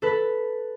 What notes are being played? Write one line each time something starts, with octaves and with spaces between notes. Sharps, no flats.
A4 B4